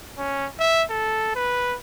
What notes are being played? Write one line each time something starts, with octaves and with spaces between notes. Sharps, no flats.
C#4
E5
A4
B4